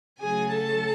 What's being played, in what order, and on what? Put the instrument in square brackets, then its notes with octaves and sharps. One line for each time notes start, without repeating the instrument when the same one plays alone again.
[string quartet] C#3 F#3 A3 G#4 G#5
A4 A5